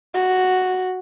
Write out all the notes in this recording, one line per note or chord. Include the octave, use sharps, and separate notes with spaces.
F#4